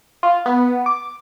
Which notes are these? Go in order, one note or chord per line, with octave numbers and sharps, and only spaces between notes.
F4
B3
D6